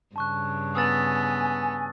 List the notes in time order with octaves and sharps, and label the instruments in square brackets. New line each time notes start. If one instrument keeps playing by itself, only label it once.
[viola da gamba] G2 C#3 [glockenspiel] A5 C#6 F#6
[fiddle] B3 [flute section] G#5 [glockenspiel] D#6 E6 A6